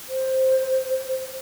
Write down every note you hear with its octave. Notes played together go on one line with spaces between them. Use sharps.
C5